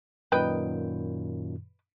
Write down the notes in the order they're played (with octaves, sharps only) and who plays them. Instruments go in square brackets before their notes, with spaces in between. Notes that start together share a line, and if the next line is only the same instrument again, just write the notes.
[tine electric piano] F#2 A#2 D#3 [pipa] B4 D#5 G5